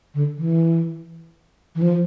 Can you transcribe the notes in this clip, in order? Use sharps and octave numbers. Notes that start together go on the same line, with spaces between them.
D3
E3
E3
F3